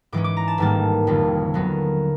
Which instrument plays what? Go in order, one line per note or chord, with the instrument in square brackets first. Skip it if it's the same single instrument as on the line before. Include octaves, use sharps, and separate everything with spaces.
[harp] G#2 E3 G#3 C#4 D6
D6
A#5
A5
A1 G#2 D#3 G3 A#3 A5
F1 F2 D3 G3
D#2 D3 F#3 B3 D#4